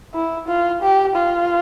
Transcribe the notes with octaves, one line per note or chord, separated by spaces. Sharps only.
E4
F4
G4
F4